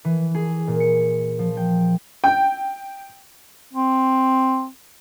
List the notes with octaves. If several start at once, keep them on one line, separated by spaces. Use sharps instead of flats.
E3
G#4
A#2
C#7
F3
G5
G5
C4